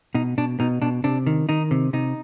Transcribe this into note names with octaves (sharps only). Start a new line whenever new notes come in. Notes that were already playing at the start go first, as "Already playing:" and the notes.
B2 D#4
B2 D4
B2 D#4
B2 D4
C3 D4
D#3
D#3 D#4
C3
C3 D#4